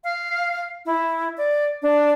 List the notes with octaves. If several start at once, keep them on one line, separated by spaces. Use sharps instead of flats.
F5
E4
D5
D4